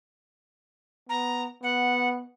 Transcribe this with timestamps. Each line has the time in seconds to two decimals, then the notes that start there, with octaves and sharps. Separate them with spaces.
1.09 B3 A#5
1.63 B3 F#5